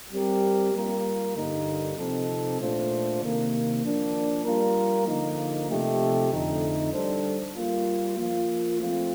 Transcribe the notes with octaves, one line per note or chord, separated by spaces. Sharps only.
G3 C4 G4 A#4
G3 A#3 F4 A#4
G2 D3 G3 A#3 D#4
C3 F3 C4 D#4 A4
A#2 A3 D4 F4 C5
C3 D#3 A#3
F3 A#3 D4
G3 A#3 F4 A#4
D3 F3 A#3 D#4
C3 F3 A3 D#4 G4
F2 D3 A3 D#4
G3 D4 A4 C5
G3 A#3 F4
F3 A#3 F4
F3 A3 C4 F4